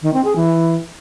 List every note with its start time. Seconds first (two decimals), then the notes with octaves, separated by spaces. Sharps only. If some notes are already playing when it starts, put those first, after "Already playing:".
0.02 D#3
0.13 C4
0.24 G#4
0.36 E3